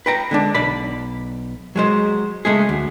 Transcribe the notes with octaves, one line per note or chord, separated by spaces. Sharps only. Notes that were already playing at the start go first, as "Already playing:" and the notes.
B4 G5 A#5
D3 G#3 D4
B1 D5 B5
F#3 G#3 C5
C#3 G#3 A3 G#4
D2